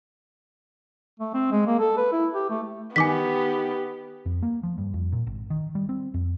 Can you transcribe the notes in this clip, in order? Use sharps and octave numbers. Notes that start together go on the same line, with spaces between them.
A3
C4
G#3
A#3
A4
B4
E4
G4
A3
D#3 B3 G4 G#5 D6 B6
F2
A#3
F3
G2
F2
A#2
G#1
D#3
G3
C4
F2